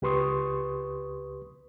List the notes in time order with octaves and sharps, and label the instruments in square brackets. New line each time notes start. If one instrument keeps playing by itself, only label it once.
[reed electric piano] C#2 G4 B4 C6 C#6 D#6